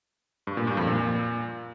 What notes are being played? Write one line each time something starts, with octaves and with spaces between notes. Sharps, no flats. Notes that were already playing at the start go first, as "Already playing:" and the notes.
G2
A#2
G2
F2
A#2